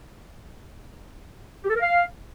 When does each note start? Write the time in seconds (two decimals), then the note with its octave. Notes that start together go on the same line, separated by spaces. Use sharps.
1.64 G4
1.70 A4
1.75 A#4
1.81 F5